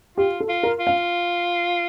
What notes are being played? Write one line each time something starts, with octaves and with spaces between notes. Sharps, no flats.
F4 G4
A4
F4
A#4
F4
F5